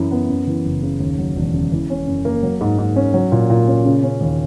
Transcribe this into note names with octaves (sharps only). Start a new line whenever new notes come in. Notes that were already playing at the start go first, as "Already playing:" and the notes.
Already playing: F#2 E3 E4
B3
F#2
E3
F#1
C#3
D#2
F#3
E1
C#3
E3
C#4
F#2
A#3
F#3
G#2
G#2
C#4
F#3
A#2
A#2
C#4
C#3
C#4
D#2